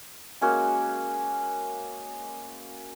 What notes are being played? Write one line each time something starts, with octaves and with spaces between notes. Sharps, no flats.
G#3 A#3 C#4 F#4